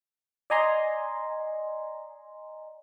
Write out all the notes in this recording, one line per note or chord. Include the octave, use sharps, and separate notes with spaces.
D5 D#5 G#5 A#5 C6